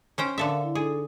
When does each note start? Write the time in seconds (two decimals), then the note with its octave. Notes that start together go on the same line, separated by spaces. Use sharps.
0.18 C#4 C5 G5
0.38 D3 A4 A#4 E5 F5
0.63 E4
0.75 D4 D#4 G#4 A4